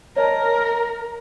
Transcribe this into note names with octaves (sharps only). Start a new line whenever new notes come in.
A#4 C#5 D#5 A5